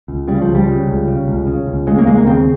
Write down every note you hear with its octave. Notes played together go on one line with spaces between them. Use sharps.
C#2
C#3 G3
F3
C#2
G3
C#3
C#2
C#3
C#2
C#3
C#2
C#3 G#3
A#3
D#2 G#3
A#3
C#3 C4